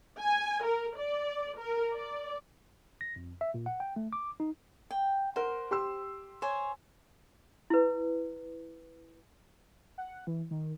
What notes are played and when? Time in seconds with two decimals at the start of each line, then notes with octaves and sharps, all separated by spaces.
0.20 G#5
0.63 A#4
0.98 D5
1.58 A#4
1.94 D5
3.01 A#6
3.16 F2
3.41 E5
3.54 A#2
3.66 F#5
3.80 G5
3.96 A3
4.13 D6
4.40 D#4
4.91 G5
5.36 A#4 C5 F#5
5.71 G4 C6 E6
6.42 C5 C#5 G#5
7.70 E4 B4
9.98 F#5
10.27 E3
10.51 D#3